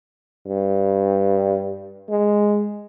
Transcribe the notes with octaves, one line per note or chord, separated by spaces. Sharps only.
G2
G#3